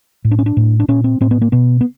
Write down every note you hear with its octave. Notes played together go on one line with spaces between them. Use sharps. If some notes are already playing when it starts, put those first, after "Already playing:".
A2
D4
C#4
D4
A2
D4
A#2 C#4
C4
A2 C4
B3
A#3
B2 B3
B3